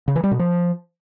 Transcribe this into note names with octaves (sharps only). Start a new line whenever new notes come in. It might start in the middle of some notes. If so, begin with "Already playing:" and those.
C#3
E3
G3
B2
F3